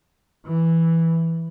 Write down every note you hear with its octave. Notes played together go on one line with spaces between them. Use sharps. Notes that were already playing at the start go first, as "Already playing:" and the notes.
E3